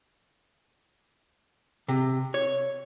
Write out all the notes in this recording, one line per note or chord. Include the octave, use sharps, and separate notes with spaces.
C3
C#5